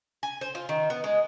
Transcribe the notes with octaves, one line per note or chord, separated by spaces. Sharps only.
G#5
C5
F4
D#3
B3
G#3